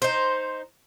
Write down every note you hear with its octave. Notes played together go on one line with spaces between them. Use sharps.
D#4 C5